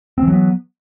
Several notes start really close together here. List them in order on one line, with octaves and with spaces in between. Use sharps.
C4 E3 F#3 B3